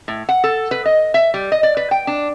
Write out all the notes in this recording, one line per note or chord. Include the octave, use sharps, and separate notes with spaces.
A2
F#5
A4
B4
D#5
E5
G3
D#5
D5
B4
G5
D4